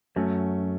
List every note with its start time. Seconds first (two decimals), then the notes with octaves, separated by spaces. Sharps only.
0.16 F#2 F#3 A3 C#4